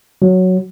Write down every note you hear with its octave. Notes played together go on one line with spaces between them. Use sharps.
F#3